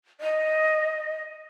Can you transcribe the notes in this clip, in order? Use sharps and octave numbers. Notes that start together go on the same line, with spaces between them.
D#5